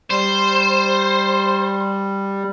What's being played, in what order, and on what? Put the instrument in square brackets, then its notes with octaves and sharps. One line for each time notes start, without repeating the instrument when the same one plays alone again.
[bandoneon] G3 [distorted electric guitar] C5